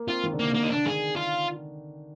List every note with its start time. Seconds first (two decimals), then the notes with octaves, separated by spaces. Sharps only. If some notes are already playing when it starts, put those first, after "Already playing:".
Already playing: A#3
0.08 C4 F4
0.24 D#3
0.33 D3
0.39 C3 A#3
0.52 D3 A#3
0.63 D#4
0.70 D4
0.75 D3
0.86 D#3 G#4
1.16 F4